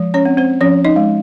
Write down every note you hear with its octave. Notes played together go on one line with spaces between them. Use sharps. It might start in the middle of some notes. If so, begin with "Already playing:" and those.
Already playing: F3 G#3
C#4 C#5
C4
C4 C5
F3 C#4 C#5
D#4 D#5
G#3